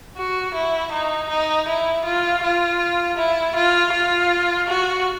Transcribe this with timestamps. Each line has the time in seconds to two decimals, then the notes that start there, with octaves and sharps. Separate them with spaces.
0.17 F#4
0.55 E4
0.92 D#4
1.30 D#4
1.68 E4
2.05 F4
2.43 F4
3.17 E4
3.55 F4
3.92 F4
4.68 F#4